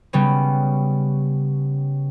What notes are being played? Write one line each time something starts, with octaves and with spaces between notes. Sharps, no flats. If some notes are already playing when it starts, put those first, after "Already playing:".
C#3 G3 B3 C#4